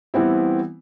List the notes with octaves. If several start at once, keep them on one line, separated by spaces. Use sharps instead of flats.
E3 G3 B3 C4 E4